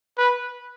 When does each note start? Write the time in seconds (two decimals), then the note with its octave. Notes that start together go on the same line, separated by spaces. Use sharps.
0.18 B4